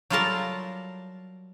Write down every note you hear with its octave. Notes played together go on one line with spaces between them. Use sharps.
F#3 G3 F4 A4 A#4 A5